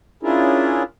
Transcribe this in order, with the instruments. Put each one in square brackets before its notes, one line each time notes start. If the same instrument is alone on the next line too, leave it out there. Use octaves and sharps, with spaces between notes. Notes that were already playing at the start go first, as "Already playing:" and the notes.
[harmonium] C#4 D4 E4 F4 G#4 A#4